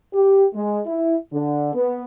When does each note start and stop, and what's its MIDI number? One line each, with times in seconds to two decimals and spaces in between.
0.13 0.46 67
0.55 0.79 56
0.86 1.15 64
1.33 1.72 50
1.74 2.04 59